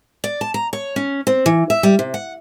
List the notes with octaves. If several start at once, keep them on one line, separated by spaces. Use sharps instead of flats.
D5
A5
A#5
C#5
C#4
C4
E3
E5
G3
C3
F#5